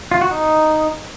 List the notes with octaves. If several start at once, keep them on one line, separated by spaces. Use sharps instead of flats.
F4
F#4
D#4